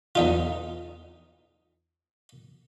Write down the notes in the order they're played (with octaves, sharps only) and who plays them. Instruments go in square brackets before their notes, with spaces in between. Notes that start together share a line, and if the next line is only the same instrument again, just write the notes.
[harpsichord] E2 D#4 F4